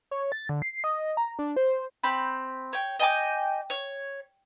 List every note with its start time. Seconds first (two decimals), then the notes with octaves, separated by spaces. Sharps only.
0.11 C#5
0.32 A6
0.49 D3
0.62 C7
0.84 D#5
1.17 A#5
1.39 D4
1.56 C5
2.03 C4 B5 G6
2.73 C#5 G5
2.99 D#5 G5 G#5 D6
3.70 C#5